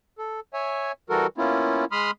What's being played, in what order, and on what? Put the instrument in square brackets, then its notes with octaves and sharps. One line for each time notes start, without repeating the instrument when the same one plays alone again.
[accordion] A4
C#5 E5 G#5
E3 G3 F#4 A4 A#4
A#3 B3 C#4 E4 F4
G#3 B5 C6 D#6 F6